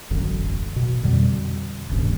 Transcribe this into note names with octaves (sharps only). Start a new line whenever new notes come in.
E1 A1 F#2 D3
B2
F2 B2 D3 G3
D#1 C#2 G2 A#2